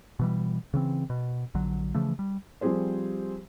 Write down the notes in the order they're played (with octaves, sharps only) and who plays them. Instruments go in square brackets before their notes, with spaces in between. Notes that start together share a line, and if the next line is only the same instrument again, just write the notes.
[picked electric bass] B2 E3 G3
C#3 E3 C4
B2
A#1 D3 F#3
C#3 E3 F3 A3
G3
[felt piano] F3 G3 C4 G4 G#4 C5